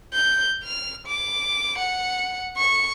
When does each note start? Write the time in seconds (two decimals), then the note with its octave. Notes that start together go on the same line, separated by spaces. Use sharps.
0.13 G6
0.63 F6
1.07 D6
1.78 F#5
2.57 C#6